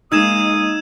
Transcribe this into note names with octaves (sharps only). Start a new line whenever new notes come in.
G#3 A#3 D#4 D#6 E6 G#6 E7